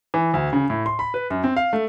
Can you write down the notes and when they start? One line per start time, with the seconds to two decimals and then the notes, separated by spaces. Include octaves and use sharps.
0.14 E3
0.34 D2
0.53 C#3
0.70 A2
0.86 C6
0.99 B5
1.14 B4
1.30 F#2
1.44 C4
1.56 F5
1.73 A3